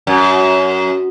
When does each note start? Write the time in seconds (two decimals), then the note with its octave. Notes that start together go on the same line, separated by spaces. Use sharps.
0.07 F#2